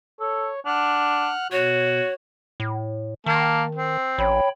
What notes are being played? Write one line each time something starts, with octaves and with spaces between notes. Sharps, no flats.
A4 C#5
D4 F#5 F6 F#6
B2 F#4 C#5
A2
D#3 A#3 A5
C4
A1 C#5 G5 B5